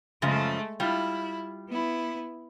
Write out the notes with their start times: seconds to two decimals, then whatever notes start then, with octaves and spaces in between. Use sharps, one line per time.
0.22 F#2 C#3 F3 G#3 A3
0.80 G3 E4 F4
1.69 B3 E4